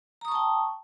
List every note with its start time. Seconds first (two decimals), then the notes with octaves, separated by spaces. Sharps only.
0.21 A#5
0.25 D#6
0.28 C#6
0.32 A5
0.35 G5